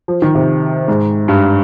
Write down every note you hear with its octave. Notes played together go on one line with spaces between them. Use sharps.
F3
D#3
C3
G#2
G2